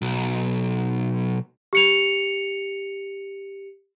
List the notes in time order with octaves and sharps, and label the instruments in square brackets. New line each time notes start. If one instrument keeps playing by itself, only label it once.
[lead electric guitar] B1
[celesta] G4 C#7 F7